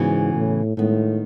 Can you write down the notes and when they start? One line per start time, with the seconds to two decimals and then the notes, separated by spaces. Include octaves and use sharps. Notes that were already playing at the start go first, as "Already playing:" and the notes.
Already playing: G#2 C#3 E3 B3 F#4
0.35 A2
0.77 A2 D#3 G#3 B3